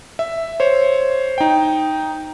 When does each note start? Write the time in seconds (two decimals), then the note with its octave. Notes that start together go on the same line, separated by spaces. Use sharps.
0.19 E5
0.60 C5 C#5
1.38 D#4 G5